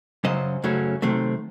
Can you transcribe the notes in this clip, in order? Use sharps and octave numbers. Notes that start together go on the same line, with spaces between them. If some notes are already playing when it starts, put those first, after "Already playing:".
F#2 C#3 F#3 C5 D#5
F#2 C#3 F#3 A3 C#4
C3 D#3 F#3 A3 C4